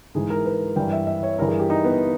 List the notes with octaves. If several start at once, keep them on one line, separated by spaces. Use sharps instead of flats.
G#2 E3 G#4
A#4
B4
G2 E3 G5
E5
E5
C#5
G2 E3 A#4
G#4
G4
D#4
B3